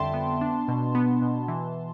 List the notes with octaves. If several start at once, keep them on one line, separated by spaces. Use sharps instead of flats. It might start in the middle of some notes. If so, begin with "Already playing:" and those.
Already playing: F2 D3 G3 E5 G5 A5 C6
B3
D4
B2
B3
B2
E3